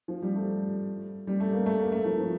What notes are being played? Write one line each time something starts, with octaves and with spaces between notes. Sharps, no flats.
F3
G3
A3
G3
A3
A#3
A3
A#3
A3
F3
F3